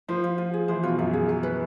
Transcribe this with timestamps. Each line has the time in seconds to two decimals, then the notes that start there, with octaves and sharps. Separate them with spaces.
0.08 F3 C5
0.24 F4
0.38 F4
0.54 G#4
0.68 E3 C5
0.83 B2 F4
0.98 F#2 F4
1.13 G#4
1.29 G#5
1.43 B4